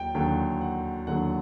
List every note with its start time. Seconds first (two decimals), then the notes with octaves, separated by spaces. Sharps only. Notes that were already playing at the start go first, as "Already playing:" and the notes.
Already playing: D#2 F#3 G5
0.15 D#2 D3 F#3 G5
0.61 F#5
1.07 D#2 D3 F#3 F#5